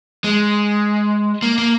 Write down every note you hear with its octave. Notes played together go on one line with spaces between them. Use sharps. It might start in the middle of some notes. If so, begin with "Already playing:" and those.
G#3
A#3
A#3